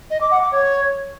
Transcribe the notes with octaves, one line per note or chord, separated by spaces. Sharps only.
D#5
D6
F#5
D6
C#5